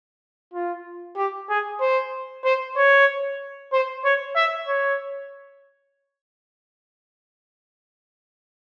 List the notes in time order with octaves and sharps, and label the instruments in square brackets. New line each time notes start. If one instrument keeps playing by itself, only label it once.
[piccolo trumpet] F4
G4
G#4
C5
C5
C#5
C5
C#5
E5
C#5